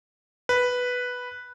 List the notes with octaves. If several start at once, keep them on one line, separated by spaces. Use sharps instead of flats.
B4